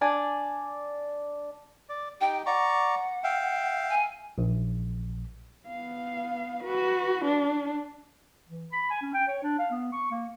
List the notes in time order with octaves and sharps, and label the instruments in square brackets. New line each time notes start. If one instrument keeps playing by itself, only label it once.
[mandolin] D4 D5 G#5
[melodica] D5
[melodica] D#4 G4 [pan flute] G5
[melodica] D5 A#5 C#6 [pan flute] F#5
[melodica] E5 F5 G5
[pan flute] G#5
[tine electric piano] A#1
[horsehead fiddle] B3 F5
F#4 B4
D4
[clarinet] E3
B5
G#5
C#4
G5
C#5
D4
F5
B3
C#6
A#3